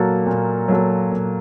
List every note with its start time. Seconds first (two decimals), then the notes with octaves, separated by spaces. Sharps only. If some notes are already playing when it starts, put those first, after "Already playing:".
Already playing: A#2 F#3 A#3 F#4 A4
0.26 A#2
0.68 F#3 A#3 F#4 A4
1.12 A#2